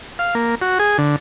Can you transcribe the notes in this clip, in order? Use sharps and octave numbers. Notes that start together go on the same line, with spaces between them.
F5
A#3
F#4
G#4
D3